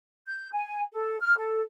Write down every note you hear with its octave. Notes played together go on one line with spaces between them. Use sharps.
G6
G#5
A4
F6
A4